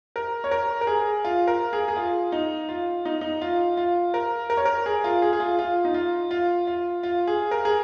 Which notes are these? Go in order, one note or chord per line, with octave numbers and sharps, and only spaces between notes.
A#4
C#5
A#4
A#4
G#4
F4
A#4
G#4
G#4
F4
D#4
F4
D#4
D#4
F4
F4
A#4
A#4
C#5
A#4
G#4
F4
G#4
G#4
F4
F4
D#4
F4
F4
F4
F4
G#4
A#4
G#4